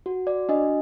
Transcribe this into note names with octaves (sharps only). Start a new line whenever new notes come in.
F#4
D5
D4 D#5